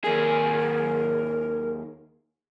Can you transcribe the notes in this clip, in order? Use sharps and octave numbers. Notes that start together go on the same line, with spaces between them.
D#2 G#4 A#4